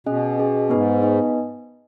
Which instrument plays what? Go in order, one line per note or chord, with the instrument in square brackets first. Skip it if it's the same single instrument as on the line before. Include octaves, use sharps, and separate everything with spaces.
[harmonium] B2 [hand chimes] C#4 G#4 D#5 G#5
[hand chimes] C#4 G#4 D#5 G#5
[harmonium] G#2 [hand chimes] B3 D#4 B4 D#5 G#5
[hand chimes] B3 D#4 B4 D#5 G#5